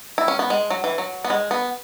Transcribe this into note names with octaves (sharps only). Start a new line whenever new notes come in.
E4
C#4
B3
G#3
F#3
E3
F#3
B3
G#3
B3